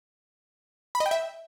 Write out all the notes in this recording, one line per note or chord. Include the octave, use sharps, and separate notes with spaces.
B5
D#5
G5
E5